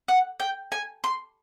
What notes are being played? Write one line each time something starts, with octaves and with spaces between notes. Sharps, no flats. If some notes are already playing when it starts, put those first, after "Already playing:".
F#5
G5
G#5
C6